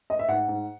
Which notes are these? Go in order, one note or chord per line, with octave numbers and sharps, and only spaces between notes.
D#5
E5
G#2 F#5
G#2